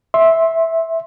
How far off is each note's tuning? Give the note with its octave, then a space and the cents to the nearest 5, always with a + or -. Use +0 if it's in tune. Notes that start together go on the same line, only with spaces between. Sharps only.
E5 -10 C6 +15